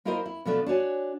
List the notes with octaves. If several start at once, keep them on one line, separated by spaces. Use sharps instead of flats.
A#3 E4 F4 A#4 C5 D#5
E4
B2 F3 A3 D4
D4 F#4 C#5 G#5